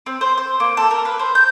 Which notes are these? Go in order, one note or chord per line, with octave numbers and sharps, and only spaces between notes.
C4
C5
C5
A#3
A4
A#4
B4
C5
G6